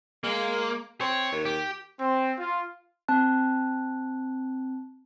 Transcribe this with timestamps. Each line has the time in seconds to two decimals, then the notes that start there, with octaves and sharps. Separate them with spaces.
0.24 G#3 A#3
1.01 C4 C#5
1.32 D#2
1.45 G4
1.99 C4
2.38 F4
3.08 C4 A5 F#6